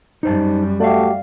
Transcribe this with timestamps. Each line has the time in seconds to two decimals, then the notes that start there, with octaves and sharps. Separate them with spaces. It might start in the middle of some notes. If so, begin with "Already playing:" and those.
0.23 F#2 G3 D#4 C5 A5
0.80 A3 F#4 G4 D5 E5 F5